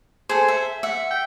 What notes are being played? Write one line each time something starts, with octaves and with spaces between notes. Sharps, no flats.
G#4 A4 C5
E5
E5 F#5
G5